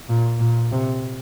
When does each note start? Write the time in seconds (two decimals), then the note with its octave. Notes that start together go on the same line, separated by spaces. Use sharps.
0.09 A#2
0.40 A#2
0.72 C3